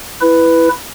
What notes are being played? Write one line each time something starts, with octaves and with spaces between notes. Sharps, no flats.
E4 B4